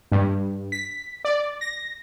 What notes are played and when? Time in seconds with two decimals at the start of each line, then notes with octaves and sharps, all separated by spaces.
0.12 G2
0.72 B6
1.25 D5
1.61 A#6